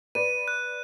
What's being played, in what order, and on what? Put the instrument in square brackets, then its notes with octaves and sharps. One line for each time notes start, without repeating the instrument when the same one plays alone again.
[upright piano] B4 D5 [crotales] D#7
[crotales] F#6